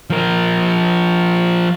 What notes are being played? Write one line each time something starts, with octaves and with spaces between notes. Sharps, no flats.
F3 A#4